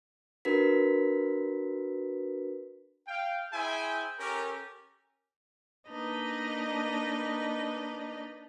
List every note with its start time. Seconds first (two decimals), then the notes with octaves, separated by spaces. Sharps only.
0.45 D4 F#4 A#4 B4 B6
3.07 F5 G5
3.52 E4 G#4 C5 E5 G5 G#5
4.19 C#4 G4 A4 A#4
5.89 A#3 D4 D#4 B4 D#5